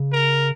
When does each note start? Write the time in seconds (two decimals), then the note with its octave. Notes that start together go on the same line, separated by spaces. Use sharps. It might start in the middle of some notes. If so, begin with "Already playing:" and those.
Already playing: C#3
0.12 A#4